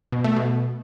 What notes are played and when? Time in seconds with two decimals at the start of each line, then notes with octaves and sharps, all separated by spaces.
0.12 B2
0.24 A3
0.36 B2